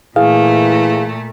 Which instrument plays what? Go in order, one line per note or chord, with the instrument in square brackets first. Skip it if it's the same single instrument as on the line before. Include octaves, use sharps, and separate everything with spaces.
[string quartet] A#2 A3 [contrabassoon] E3 [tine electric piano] G#4 [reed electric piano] F5